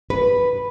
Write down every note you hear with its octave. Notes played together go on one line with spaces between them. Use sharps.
B4